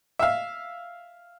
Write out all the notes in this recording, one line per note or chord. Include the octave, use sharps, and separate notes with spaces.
E5 F5